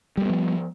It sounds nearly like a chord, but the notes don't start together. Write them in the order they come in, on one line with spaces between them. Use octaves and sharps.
G3 A#3 B3 F3